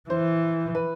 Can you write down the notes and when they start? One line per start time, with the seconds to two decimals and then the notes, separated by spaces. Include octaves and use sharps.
0.09 E3 C5
0.75 B4